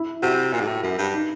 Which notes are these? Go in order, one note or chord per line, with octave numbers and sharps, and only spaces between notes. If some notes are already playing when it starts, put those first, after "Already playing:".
Already playing: E4
C3 F#4
A#2
G#2
A2
F#2
G2
D#4